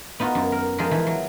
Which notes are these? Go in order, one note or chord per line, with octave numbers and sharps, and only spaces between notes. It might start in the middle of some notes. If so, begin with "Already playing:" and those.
B3 D#4 F4 F#4
F#2
A#4
F3 G#3 G#4 A#4
E3 F3
F#3